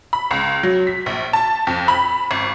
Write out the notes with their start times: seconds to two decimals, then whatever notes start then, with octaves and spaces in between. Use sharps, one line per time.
0.13 B5
0.31 C#2
0.63 F#3
0.87 B6
1.06 A#1
1.33 A5
1.67 F2
1.88 B5
2.31 G#1